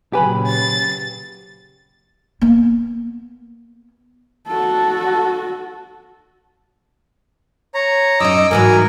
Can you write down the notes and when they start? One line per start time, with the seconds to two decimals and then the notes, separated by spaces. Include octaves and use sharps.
0.13 A#2 C#3 F#3 G4 B4 G#5 A5 B5
0.47 A6
2.41 A#3 B3
4.48 F#4 A4
7.74 C#5 A#5
8.20 F#2 D#4 D#5 D6 E6
8.51 G#2 E3 F#3 A#4 G#5